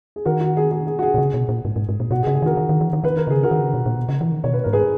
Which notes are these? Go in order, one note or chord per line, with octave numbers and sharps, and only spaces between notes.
G#4
D#3 F#4 A#4
F#4
G#4
G#4
G#4
F#4
G#4
B2
C#3
B2
A#2
G#2
G#2
G#2
A#2
B2 F#4
G#4
C#3
G#4
D#3 F#4 A#4
D#3
D#3
E3
D#3
D#3 B4
A#4
C#3 G#4
F#4 A#4
D#3
C#3
B2
A#2
B2
C#3
E3
D#3
B2 C#5
B4
G#2 A#4
G#4 B4